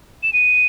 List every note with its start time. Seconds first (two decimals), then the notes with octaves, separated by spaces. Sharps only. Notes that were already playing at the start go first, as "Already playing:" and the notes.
0.23 E7
0.33 D#7